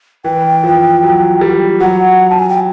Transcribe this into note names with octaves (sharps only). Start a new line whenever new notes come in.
E3 G5
F3
F#3
G3
F#3 F#5
A5
G#5
G5